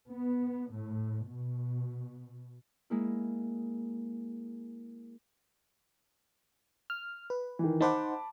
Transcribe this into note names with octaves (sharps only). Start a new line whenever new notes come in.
B3
A2
B2
G#3 A#3 E4
F6
B4
D#3 E3
D#4 C5 F#5 A5 B5 D6